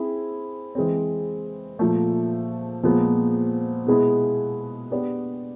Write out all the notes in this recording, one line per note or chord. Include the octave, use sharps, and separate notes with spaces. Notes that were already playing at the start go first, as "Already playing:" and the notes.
Already playing: C4 E4 G#4
E3 G#3 C4
A#2 F3 A3
A#2 F3 G#3 B3
B2 G#3 B3 E4 G#4
B3 D4 G4 B4 D5